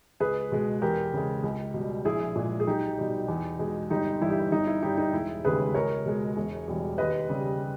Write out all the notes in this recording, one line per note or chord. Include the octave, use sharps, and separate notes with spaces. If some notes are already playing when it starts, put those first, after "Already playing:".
C#2 G#4 B4
B2 G#3
E2 G4 A#4
C#3 G#3
C#2
B2
G3
A#1 E4 G#4
A#2 G#3
G#4
B1 D#4 G4
B2 G3
E2
B2 G#3
G1 D#4 G4
G2 E3 G3 E4
G4
E4
G1 D#4
E4
G2 G3 D#4 G4
D#4
E1 E4
D#2 C#3 G#3 G#4 B4
C#2 A#4 C#5
B2 G#3
E1
E2 B2 G3
D#2 B4 D#5
C#3 G3